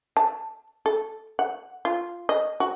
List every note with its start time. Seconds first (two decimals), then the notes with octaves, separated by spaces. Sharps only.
0.17 A5
0.86 A4
1.39 F#5
1.85 F4
2.29 D#5
2.60 F#4